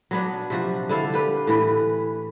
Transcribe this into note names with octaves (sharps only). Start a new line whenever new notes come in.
F#3 B3 D4
C3 F3 F#4
D3 E4 A4 F5
G4 B4
A2 E3 B4